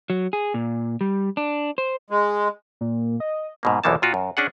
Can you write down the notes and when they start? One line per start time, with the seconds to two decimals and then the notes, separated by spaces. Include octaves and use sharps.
0.10 F#3
0.33 G#4
0.54 A#2
1.01 G3
1.37 D4
1.78 C5
2.10 G#3
2.81 A#2
3.20 D#5
3.63 G#2 B2 A#3
3.84 B1 E2 E3 F3 A#3 A5
4.02 A#2 F4 F#4
4.14 F#2
4.37 C#4 D4 G#4 F#5